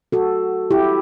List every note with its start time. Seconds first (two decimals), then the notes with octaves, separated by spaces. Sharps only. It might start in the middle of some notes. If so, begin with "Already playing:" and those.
0.12 F#4 A4
0.71 E4 G4